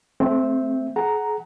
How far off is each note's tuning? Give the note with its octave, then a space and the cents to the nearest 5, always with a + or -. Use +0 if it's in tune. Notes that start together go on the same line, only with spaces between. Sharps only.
A3 -35 C4 +0 E5 +10
G#4 +35 F#5 +10 A#5 +0